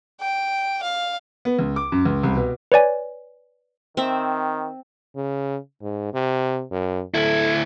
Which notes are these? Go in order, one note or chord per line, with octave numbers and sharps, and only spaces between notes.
G5
F5
B3
C#2
D6
F#2
C#2
C2
B2
B4 C#5 D5 G#5
D#3 C4 E5
C#3
G#2
C3
F#2
D2 E4 A4